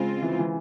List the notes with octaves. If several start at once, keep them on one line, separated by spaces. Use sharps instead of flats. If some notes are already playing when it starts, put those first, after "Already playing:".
Already playing: C#3 G#3 C4 F4
E3
E3